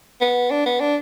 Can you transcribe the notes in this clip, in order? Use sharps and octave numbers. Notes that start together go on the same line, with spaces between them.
B3
D4
B3
D4